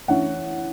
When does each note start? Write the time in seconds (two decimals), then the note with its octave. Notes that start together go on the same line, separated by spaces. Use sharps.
0.08 E3 C#4 F#5